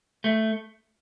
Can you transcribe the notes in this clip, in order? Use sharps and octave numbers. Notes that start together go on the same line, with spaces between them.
A3